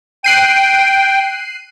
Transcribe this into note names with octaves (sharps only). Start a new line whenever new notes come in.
G5 F#6 C7 D#7